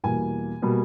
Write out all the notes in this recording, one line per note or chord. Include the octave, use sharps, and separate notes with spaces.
E2 B2 G3 A#3 G#5
B2 G3 A#3